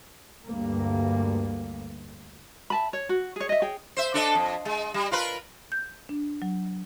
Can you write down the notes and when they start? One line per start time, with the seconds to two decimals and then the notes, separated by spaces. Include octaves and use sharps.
0.48 D2 G2 A#3
2.70 E5 A5 B5
2.93 C#5
3.09 F#4
3.36 G#4 C#5
3.49 D#5 E5
3.62 G#4 C#5 G5
3.97 C5 E5
4.14 D4 A4 D#5
4.35 F2
4.65 G#3
4.94 G3
5.11 F4 A#4 B4
5.72 G6
6.09 D4
6.42 F#3